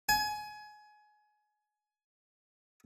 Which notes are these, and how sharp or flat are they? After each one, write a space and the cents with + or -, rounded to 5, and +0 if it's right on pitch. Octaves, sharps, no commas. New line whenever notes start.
G#5 +25